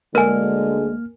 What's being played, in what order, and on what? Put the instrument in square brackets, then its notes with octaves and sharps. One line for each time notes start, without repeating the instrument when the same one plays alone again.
[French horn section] D2 D3 G#3 [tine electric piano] A#3 F6 [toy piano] A#4 G#5